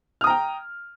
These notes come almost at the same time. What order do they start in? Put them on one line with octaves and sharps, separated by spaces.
F6 D#6 A#5 G5